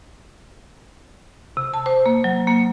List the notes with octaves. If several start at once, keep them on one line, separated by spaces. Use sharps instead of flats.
C3
A5
C5
A#3
F#3
A#3